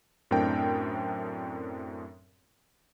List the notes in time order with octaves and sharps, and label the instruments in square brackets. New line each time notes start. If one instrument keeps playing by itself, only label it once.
[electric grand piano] F#2 A2 C4 D4 A#4 G5